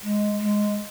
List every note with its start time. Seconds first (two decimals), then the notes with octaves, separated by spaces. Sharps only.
0.03 G#3
0.40 G#3